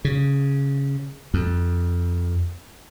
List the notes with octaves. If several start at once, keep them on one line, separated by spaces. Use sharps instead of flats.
C#3
F2